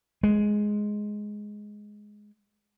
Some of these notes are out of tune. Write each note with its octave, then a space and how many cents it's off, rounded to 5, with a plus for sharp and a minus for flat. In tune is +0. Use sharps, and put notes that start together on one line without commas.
G#3 +5